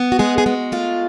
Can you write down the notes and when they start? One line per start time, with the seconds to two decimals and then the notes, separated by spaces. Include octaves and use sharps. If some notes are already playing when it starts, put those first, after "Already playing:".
Already playing: B3
0.12 F#4
0.19 G#3 G#4
0.38 G#4
0.46 G#3 F#4
0.72 A3 F4